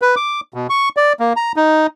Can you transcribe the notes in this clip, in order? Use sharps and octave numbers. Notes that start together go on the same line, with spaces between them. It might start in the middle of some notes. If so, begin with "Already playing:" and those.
B4
D6
B2
C#6
D5
A#3
A#5
D#4